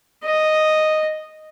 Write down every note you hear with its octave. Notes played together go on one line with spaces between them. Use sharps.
D#5